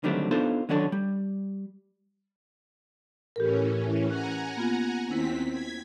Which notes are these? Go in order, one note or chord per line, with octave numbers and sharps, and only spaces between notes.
D3 D#3 F#3 G3 A3 C4
B3 D4 D#4 F4 A4 C5
D3 D#3 F#3 C#4 D4 A4
G3
A2 E3 C#4 G4 A4 A#4
C#4 F#5 G#5 A#5 F#6
A#3 B3 F4
D#2 C4 C#4 E4 B6
G#6 B6